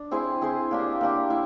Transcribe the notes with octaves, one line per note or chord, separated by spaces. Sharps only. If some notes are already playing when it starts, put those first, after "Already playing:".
Already playing: D4
C4 E4 G#4 C5
C4 E4 G#4 C5
A#3 D4 G4
A#3 D4 G4
E4